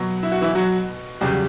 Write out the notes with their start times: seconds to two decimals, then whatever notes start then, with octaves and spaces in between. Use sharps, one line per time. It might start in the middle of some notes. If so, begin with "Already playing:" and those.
Already playing: B2 F#3
0.23 E4
0.32 F#4
0.41 E3 E4
0.55 F#3 F#4
1.21 E2 C#3 F#3 G3 G4